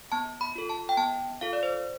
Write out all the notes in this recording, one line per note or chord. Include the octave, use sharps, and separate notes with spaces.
B3 A5
B5
F4 A4
A5
G5
B3 A5
F4 A4 F5
D5
C5